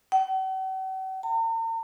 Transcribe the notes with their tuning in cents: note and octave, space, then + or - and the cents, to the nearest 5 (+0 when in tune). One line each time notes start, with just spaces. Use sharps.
F#5 +45
A#5 -45